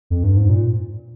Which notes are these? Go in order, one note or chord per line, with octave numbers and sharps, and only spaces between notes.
F2
G2
G#2
A#2